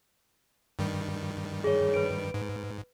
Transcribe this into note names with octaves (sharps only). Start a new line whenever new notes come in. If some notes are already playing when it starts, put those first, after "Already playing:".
G2 D#3 G3
G#4 C#5
B4 D7
G#2